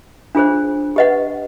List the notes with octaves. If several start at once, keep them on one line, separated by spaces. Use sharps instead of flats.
D4 F4 G#4 C5
G4 B4 D#5 F#5